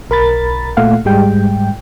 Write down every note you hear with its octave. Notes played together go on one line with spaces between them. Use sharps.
B1 A#4 B5 A6
A#2 A3 F5 F#5
G#2 G3 G#3 G5